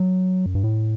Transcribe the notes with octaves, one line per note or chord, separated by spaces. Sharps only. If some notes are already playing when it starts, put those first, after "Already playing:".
Already playing: F#3
F#2
G2
A2